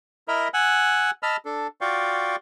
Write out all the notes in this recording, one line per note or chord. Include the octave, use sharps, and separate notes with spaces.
E4 A#4 D#5 E5 A#5 B5
F#5 G#5 E6 F#6
D#5 A5 B5 E6 F6
D4 A4
F4 F#4 D5 F5 G5 C#6